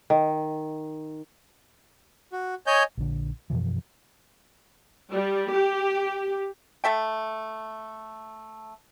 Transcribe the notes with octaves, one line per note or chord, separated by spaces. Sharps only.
D#3
F#4
C#5 D#5 G#5 G6
A#1 D3
F#2 B2 E3 F3
G3
G4
A3 A4 E5 G5